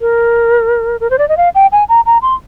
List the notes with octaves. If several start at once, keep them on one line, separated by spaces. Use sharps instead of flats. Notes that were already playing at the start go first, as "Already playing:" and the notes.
A#4
A#4
C5
D5
D#5
F5
G5
G#5
A#5
A#5
C6